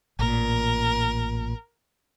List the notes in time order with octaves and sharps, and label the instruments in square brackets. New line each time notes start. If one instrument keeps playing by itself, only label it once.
[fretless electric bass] A1 A#2 [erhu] A#4